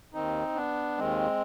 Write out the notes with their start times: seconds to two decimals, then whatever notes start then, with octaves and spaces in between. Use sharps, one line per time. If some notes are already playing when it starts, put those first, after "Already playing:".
0.13 D#2 D#3 C4 D#4
0.56 B3 D4
0.98 D#2 D#3 G#3 C4